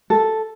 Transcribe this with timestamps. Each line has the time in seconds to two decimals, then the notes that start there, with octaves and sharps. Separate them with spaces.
0.10 A4